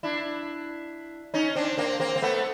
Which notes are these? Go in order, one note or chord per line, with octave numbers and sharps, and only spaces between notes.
D4 E4
C#4 D#4
C4 D4
A#3 C4
A#3 C4
C4
A3 B3